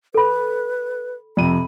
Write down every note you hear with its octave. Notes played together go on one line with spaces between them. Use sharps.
A4 B4 B5
F2 C3 B5 D#7